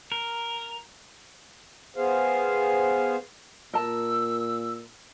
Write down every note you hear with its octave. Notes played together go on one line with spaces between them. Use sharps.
A#4
B3 G#4 C5 F5
A#2 A#4 A5 E6